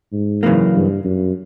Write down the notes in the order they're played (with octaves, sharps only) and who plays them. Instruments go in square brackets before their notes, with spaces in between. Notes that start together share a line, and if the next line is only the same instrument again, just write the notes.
[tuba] G#2
[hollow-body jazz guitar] F#2 C#3 E3 G3 A#3
[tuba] G2
F#2